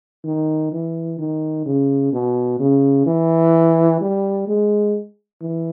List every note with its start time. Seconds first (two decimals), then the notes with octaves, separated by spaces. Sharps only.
0.24 D#3
0.72 E3
1.19 D#3
1.66 C#3
2.13 B2
2.60 C#3
3.06 E3
4.01 G3
4.48 G#3
5.41 E3